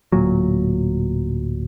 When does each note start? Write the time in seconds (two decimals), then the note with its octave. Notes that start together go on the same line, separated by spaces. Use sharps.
0.12 D1 A#2 F#3